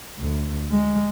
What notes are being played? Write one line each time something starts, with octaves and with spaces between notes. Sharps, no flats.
D2
G#3